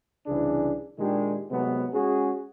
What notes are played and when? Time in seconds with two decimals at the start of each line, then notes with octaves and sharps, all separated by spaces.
0.26 C2 C#3 E3 D4 G#4
0.97 A#2 D#3 G#3 D4 G4
1.49 C3 D#3 F#3 G#3 A3 B3
1.92 G#3 C#4 F#4 G#4